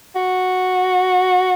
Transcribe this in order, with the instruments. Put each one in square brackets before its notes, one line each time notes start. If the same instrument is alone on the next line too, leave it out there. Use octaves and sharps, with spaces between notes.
[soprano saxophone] F#4